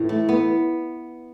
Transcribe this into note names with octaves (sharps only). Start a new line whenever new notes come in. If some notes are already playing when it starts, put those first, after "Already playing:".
Already playing: A2 E3
A3
B3